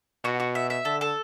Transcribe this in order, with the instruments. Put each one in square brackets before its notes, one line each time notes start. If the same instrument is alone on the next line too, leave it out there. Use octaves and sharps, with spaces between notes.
[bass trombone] B2 [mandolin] F#4
[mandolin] F#4
E5
E5
[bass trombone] D3 [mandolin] A4
[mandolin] A4